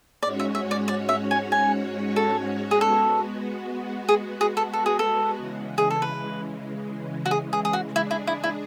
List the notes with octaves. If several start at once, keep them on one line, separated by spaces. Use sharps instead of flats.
G#2 G#3 C#4 F#4 C#5 D5
E5
E5
D5
D5
E5
G#5
G#5
A4
G#4
G#3 B3 F#4 A4
G#4
G#4
A4
A4
G#4
A4
C#3 E3 G#3
G#4
A4
B4
F#4
G#4
G#4
G#4
F#4
G#3 D4 E4 G#4
E4
E4
E4